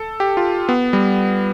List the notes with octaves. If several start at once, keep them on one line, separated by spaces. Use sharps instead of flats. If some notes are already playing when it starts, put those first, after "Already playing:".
Already playing: A4
G4
F4
B3
G3